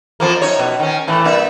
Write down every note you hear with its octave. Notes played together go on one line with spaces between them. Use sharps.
F2 F3 A#3
F#2 D#4 C#5
B2
D#3 C#4
A2 E3 A3
G2 A#3 E5